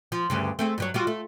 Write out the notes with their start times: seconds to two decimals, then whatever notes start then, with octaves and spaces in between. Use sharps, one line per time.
0.12 F3
0.30 D2 G2 C#3
0.59 A3 C4 G#4
0.78 G2 F#3 C#5
0.94 G3 F4 F#4
1.07 A3